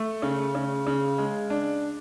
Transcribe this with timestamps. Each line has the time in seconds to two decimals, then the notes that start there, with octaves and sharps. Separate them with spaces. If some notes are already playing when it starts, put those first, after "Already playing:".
Already playing: A3
0.22 C#3
0.55 C#3
0.87 C#3
1.18 G#3
1.50 D4